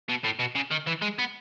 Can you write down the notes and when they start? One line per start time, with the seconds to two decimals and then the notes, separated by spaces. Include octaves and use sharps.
0.09 B2
0.24 A2
0.39 B2
0.55 C#3
0.71 D#3
0.87 E3
1.02 G#3
1.18 B3